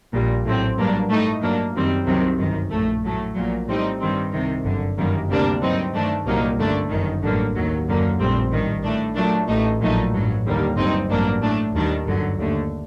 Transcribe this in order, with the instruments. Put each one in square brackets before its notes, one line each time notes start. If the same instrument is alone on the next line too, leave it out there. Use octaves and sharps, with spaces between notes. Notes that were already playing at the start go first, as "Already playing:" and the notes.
[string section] A#1 A#2 G3
A1 A2 F#3 C4
G2 F#3 A#3 D4
A2 A3 D#4
G2 F#3 A#3 D4
F#2 D#3 G3 C4
C2 C3 D#3 F#3 C4
G1 F#2 D#3
A#1 A2 A3
A2 F#3 A3
A#1 A#2 F#3
A2 G3 C4 D#4
G2 D#3 G3 C4
C2 C3 D#3
G1 F#2 D3
G1 F#2 D#3 G3 A#3
D2 C3 G3 A#3 D4
G2 F#3 C4 D#4
G2 D#3 A3 D4
C2 A#2 F#3 A#3 D#4
G1 F#2 D3 A3 D4
G1 F#2 D#3
A1 G2 D3 F#3 A#3
D#2 D#3 F#3
F#2 D3 F#3 A#3
A#1 A2 G3 C4
A1 G2 D#3
A2 A3 D4
A#2 F#3 A3 D4
A1 A2 A3 D#4
A#1 A#2 F#3 A3 D#4
A1 G2 F#3
D#2 D3 G3 A#3
G1 G2 F#3 C4 D#4
A1 G2 F#3 A#3 D4
A2 A3 D4
D#2 D#3 G3 D4
G1 F#2 D3 F#3
D#2 D3 A3